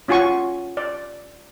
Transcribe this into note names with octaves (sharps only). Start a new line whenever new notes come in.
C#4 F4 F#4 G#5 C#6
D5